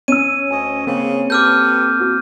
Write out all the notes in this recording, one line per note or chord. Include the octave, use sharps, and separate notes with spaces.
C#4 E6 D#7
D2 C#5 D#5 G#5
C#3 A#3 C4
G4 A4 B4 D6 F6 G6
F#4